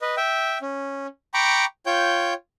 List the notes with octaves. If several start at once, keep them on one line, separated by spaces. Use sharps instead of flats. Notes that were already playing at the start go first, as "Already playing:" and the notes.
B4 D#5
E5 G5
C#4
G5 A#5 B5 C#6 D6
F4 C#5 G5 G6